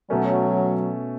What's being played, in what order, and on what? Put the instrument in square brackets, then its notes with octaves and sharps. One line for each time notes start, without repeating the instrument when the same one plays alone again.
[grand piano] B2 A3 C#4 [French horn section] F#3